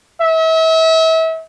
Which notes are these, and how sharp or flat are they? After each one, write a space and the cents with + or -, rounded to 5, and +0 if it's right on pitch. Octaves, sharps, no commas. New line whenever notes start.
E5 -35